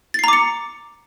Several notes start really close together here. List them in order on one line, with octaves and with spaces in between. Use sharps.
A6 C7 A#5 D6 C#7